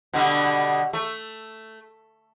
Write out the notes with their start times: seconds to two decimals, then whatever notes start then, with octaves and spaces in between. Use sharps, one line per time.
0.13 B2 D3 G3
0.93 A3